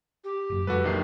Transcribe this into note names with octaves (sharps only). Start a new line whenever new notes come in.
G4
F#1 F#2
F2 F#3 G#3 F#4 A4 B4
A#1 D#3 C7